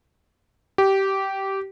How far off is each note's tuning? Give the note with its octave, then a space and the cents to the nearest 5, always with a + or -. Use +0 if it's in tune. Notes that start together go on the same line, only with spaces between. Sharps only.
G4 -15